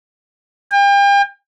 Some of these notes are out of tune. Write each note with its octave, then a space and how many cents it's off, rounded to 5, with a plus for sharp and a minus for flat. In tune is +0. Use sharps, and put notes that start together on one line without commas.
G5 +40